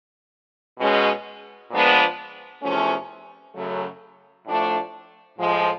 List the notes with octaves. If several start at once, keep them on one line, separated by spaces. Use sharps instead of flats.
B2 G#3 C#4
A#2 F3 G#3 B3 D4
E2 C3 F3 A3 C#4
F#2 C#3 F#3 A3
A2 F3 A3 D4
A2 F3 G#3